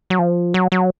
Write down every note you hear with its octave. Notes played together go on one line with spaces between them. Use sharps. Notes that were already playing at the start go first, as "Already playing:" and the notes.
F#3
F3
F#3
F#3